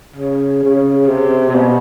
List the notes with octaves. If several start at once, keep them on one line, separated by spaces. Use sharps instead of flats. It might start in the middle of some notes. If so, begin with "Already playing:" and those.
C#3
C#3
C3
C3
B2